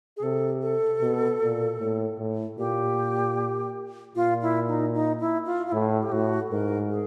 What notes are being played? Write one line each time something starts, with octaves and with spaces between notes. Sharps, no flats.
G#4
C3 A4
A4
B2
A#2
A2
A2
A#2 G4
A#2 F4
E4
D#4
D#4
E4
F4
F4
A2 E4
G4
A2 F#4
G#2 A#4
G#4